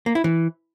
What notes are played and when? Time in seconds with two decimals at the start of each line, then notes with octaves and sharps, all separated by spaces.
0.06 A#3
0.15 E4
0.24 E3